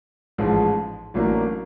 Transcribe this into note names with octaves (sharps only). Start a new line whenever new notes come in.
A1 G#2 F3 G#3
A1 A2 F#3 A#3 D4